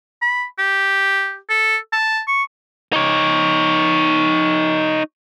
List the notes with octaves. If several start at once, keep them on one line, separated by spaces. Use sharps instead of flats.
B5
G4
A4
A5
C#6
D#4 C#5